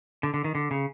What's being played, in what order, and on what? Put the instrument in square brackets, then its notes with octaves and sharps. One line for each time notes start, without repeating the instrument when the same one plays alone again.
[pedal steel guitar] D3
D3
D#3
D3
C#3